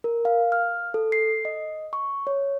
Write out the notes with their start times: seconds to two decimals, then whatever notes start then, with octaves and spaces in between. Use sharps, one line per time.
0.04 A#4
0.25 F5
0.52 F6
0.94 A4
1.12 C7
1.45 D#5
1.93 C#6
2.27 C#5